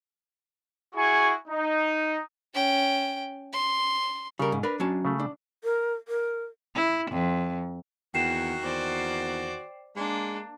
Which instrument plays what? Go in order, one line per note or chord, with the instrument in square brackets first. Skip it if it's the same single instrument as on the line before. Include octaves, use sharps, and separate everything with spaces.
[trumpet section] E4 F#4 G#4 G#5 C#6
D#4
[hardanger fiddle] C#4 G5
C6
[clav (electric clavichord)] C#3 [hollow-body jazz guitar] G3 A#4
[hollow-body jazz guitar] G#2
[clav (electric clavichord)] D4 [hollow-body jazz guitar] A#4 B4 B5
[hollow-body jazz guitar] F#3 C#4 A5
[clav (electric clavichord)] C#3 A3
[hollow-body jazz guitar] D4
[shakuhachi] A#4
A#4
[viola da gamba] E4
F2
[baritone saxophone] E2 [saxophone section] D#3 A#3 F#4 [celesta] G5 C7 E7
[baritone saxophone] E2 [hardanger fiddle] C5 D5
[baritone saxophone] G#3 [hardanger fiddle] A#3 D4